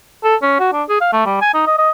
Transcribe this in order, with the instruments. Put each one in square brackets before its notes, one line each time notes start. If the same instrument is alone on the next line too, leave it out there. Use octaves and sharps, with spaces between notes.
[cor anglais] A4
C#4
F#4
D4
G#4
F5
A3
G3
G#5
D#4
D#5
D#5